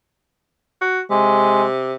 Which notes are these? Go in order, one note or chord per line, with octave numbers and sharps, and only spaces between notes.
F#4
C3 G#3